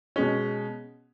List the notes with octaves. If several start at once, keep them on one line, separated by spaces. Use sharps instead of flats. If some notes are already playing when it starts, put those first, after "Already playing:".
B2 G#3 C#4